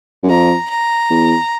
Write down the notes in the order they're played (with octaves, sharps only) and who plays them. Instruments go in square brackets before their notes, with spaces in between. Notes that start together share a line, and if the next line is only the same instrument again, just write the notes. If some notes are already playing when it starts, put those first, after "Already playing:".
[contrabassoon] F#2
[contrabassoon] F2 [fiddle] A#5
[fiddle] A#5
[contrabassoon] E2